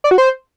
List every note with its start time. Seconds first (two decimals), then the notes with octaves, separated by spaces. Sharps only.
0.04 D5
0.11 F#4
0.18 C5